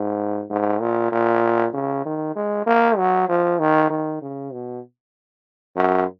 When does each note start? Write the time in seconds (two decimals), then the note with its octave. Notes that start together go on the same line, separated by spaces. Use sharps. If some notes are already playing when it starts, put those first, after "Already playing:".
Already playing: G#2
0.50 G#2
0.81 A#2
1.12 A#2
1.73 C#3
2.05 D#3
2.36 G#3
2.66 A#3
2.97 F#3
3.28 F3
3.59 D#3
3.90 D#3
4.22 C#3
4.53 B2
5.76 F#2